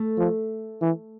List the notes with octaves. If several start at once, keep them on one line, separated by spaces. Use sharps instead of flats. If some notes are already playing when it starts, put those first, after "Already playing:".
Already playing: A3
F3
E3